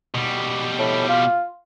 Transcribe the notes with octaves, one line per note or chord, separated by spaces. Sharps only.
B2 G3
A2
F4